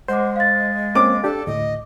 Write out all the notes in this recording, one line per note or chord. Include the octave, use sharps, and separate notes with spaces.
G#3 C5 F#5 D6
F5 A6
A#3 C4 C#4 D6
D4 G4 A4
D2 A2 D#5